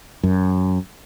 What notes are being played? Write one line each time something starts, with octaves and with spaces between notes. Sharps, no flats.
F#2